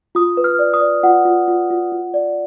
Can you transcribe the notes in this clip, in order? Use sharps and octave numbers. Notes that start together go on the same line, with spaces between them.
F4 D#6
B4
F6
D5
D#6
D5
F4 F#5
F4
F4
F4
F4
D5